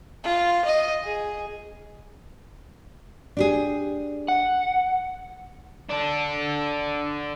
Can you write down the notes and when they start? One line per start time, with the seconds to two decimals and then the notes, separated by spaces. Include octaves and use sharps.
0.24 F4
0.65 D#5
1.03 G#4
3.37 D4 G4 G#4
4.28 F#5
5.90 D4 A4